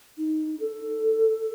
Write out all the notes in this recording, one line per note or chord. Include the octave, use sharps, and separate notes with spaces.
D#4
A4